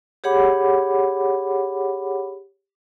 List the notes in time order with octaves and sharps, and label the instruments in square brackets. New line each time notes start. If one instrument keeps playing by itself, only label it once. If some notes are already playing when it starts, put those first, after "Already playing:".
[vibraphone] G4 G#4 C#5 F#5 B5 D6